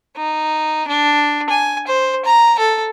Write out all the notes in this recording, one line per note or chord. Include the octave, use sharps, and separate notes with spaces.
D#4
D4
G#5
C5
A#5
A4